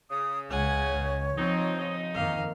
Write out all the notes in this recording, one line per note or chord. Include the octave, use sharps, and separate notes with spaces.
C#3 D#6
C#2 C#5 F#5 G#5
C#2
F3 C4 D#4
C#3 D#4 D#5
F2 D#3 A#3 F5